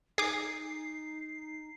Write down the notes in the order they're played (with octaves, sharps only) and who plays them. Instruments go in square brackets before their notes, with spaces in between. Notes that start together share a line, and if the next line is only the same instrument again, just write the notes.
[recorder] D#4 [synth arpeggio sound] G#4 D6 [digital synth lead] C7